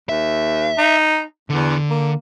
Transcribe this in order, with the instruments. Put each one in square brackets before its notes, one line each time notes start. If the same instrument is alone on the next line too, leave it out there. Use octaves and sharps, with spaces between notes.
[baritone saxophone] D#2 [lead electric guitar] E5
[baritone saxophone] D#4
[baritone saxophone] E2 [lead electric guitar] D3
[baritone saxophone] A#3